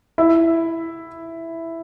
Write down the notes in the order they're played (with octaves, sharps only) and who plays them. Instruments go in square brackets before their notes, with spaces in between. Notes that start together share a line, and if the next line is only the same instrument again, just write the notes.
[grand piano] E4 E5